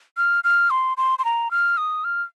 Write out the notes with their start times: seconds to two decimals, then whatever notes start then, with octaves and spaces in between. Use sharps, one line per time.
0.17 F6
0.44 F6
0.70 C6
0.97 C6
1.19 C6
1.25 A#5
1.51 F6
1.77 D#6
2.04 F6